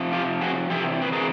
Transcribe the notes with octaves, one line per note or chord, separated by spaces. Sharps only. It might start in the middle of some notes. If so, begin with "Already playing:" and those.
Already playing: C3 F3
F4 G4
F#4 G#4
C3 E3 G4 A4
B4
G#4 A#4